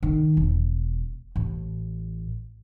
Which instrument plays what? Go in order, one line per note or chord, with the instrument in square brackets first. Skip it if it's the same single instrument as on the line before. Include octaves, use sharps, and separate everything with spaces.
[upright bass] D#3
E1
A1